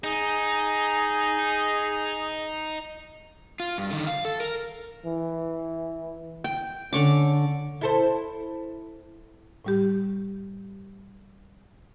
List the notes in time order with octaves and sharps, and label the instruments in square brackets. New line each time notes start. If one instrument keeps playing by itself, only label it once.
[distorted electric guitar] D#4 [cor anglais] G#4
[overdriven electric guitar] F4
G2
D3 D#3
F5
A4
A#4
[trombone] E3
[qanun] G5
[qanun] D3 C#6 D6 [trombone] C#4
[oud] E4 A4 C5
[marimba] A2 G3 G4